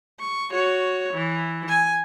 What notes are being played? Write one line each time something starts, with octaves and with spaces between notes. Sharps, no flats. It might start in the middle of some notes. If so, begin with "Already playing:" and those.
C#6
F#4 C#5
E3
G#5